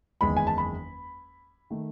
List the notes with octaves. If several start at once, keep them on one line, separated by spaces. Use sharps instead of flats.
F#1 E2 D#3 G#3 B5
G#5
A5
B5
D#3 A3